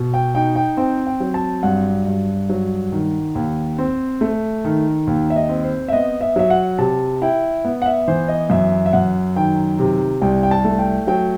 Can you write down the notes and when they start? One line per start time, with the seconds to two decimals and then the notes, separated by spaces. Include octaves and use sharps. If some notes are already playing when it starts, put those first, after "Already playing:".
Already playing: B2
0.14 G5
0.35 D#4 G5
0.56 G5
0.77 C4 G5
1.07 G5
1.20 F#3
1.34 A5
1.63 G2 F#5
2.07 G2
2.49 F#3
2.92 D#3
3.35 D#2
3.79 C4
4.21 A3
4.65 D#3
5.07 D#2
5.30 E5
5.36 D#5
5.49 C4
5.64 C5
5.88 E5
5.93 B3 D#5
6.21 E5
6.36 F#3 E5
6.50 F#5
6.78 C3 A5
7.22 E4 G5
7.65 B3
7.82 F#5
7.86 E5
8.08 E3 C5
8.28 D#5
8.50 F#2 E5
8.86 E5
8.93 F#2 F#5
9.36 D#3 G5
9.79 C3
10.21 C2 G5
10.43 G5
10.51 A5
10.64 A3
10.79 G5
11.07 F#3 G5